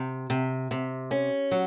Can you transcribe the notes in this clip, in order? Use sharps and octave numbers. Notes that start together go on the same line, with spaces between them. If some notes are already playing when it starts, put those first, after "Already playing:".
Already playing: C3
C3
C3
C#4
F#3